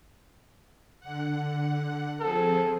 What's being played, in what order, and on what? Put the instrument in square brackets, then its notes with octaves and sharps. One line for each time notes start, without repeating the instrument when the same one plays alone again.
[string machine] D3 F#5
[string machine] F3 C4 G#4 [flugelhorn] A4